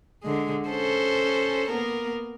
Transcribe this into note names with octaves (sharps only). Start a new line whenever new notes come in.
D3 G#3
C#4 A4 C5
A#3 B3 A#4